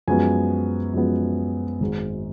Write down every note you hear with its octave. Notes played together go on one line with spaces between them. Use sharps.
F#2 F3 G#3 B3 G#5
F#2 F3 G#3 B3
G#1 G#2 G#3